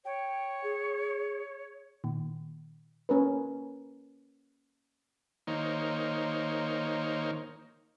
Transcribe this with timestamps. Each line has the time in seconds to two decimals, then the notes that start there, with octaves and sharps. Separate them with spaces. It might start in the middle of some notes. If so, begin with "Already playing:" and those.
0.05 C#5 G5
0.64 G#4
2.04 A#2 D#3
3.09 A#3 C#4 A#4 B4
5.47 D#3 A#3 D#4 C5 C#5